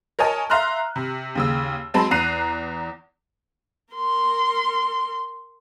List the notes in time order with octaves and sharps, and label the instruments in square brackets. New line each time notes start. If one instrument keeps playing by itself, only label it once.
[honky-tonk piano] A#4 C#5 D#5 G#5 A5
E5 F5 A#5 C6 F6 F#6
C3
D#2 C#3 E6
F#3 G#3 C4 A5 B5
E2 A#5 F#6 C7 D#7
[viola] A#4 C6